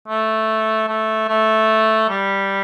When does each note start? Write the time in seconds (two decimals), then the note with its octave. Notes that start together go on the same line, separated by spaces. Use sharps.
0.08 A3
0.88 A3
1.28 A3
2.10 G3